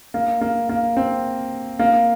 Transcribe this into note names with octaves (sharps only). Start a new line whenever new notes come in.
A#3
A#3
A#3
C4
A#3